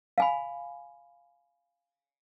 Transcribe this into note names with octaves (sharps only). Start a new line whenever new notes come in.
F5 G#5 B5